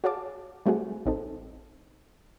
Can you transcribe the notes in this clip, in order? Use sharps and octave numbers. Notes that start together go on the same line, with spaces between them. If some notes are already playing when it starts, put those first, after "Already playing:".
F#4 G#4 C#5 F5 A5 D6
G3 A3 C4 F#4 G#4
A1 C4 D#4 A4